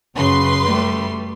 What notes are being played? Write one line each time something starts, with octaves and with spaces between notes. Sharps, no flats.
F#2 C#3 B4 C6
G3 A3